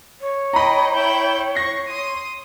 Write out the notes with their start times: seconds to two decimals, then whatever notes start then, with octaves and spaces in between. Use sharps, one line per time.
0.20 C#5
0.53 D#5 G5 A#5 B5
0.95 E4 G5 G6
1.55 C#6 A#6 C7
1.89 C6 D#6